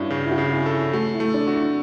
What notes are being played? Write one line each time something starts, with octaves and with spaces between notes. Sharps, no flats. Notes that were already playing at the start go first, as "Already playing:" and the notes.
Already playing: G2 C#4 D4 E4 F#4
C#3
E4
F#4
C#3
E4
A4
E4
A3 F#4
E4
A3
D4
F#4
E4